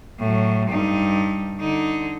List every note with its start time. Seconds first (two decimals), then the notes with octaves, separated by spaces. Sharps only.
0.19 A2 F#3
0.69 G2 D#4
1.60 D3 D#4